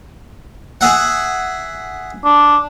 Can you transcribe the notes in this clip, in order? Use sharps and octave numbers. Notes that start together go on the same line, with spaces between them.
G#4 E5 F#5
D4